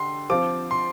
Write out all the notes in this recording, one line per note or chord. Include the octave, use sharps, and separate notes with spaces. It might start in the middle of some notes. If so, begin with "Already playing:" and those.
Already playing: D3 G4 C6
F3 C4 F4 D6
C6